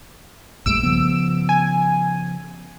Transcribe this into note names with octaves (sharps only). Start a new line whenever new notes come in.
A#1 G2 A3 E6 D7
C#3 F3 B3
G#5